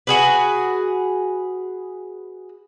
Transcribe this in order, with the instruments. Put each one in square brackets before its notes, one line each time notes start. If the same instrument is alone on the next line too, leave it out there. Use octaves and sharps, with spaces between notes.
[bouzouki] F#4 G#4 B4